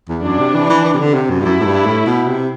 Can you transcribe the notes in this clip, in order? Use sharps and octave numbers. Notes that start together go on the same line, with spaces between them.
E2
F#2 D4
C3
E3
E3
E3
C3
D3
C3
F#2
G2
F#2 E4
A2
G2
A2
B2
C3